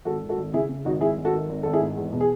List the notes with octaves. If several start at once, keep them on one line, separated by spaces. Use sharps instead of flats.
G#1 F#4 A4
G#1
F#4 A4
G#1
C#3 E4 G#4
C#3
G#1 D#4 F#4
G#1 E4 G#4
G#1
F#4 A4
D#3
G#1
G#1 A4
E4 G#4
G#2
E2
B2
G#4